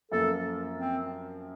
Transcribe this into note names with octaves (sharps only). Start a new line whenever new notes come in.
F#2 F3 A#3 A4
C4